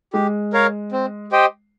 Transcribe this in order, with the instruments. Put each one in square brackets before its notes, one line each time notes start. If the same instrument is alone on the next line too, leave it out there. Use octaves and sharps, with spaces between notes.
[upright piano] G#3 [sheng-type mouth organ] G4
[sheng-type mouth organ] A#4 C#5 F5
C4
G4 C5 D#5 G5